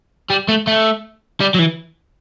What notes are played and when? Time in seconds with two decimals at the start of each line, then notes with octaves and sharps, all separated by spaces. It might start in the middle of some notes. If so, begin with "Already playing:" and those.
0.30 G3
0.48 A3
0.67 A3
1.40 G3
1.54 F#3
1.59 E3